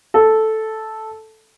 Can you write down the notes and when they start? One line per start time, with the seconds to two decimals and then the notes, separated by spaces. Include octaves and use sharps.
0.14 A4